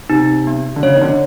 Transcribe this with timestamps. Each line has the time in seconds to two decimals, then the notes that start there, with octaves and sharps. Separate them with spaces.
0.10 C3 D#4
0.47 B3
0.76 D3
0.83 C#3 C#5
0.95 D#3
1.01 D3